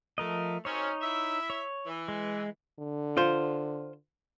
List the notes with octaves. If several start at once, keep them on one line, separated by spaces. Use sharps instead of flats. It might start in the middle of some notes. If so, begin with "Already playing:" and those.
F3 A3 A#4 D#5
F#2 C4 C#4 D#4 C#5
E4 E5
C#5
E3
G#3
D3
F4 C5